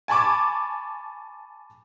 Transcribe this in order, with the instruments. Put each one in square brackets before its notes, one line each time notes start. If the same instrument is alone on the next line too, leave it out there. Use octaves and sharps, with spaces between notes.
[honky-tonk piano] G#5 A5 B5 C#6 D6